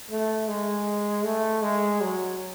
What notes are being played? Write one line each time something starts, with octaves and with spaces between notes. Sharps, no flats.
A3
G#3
A3
G#3
F#3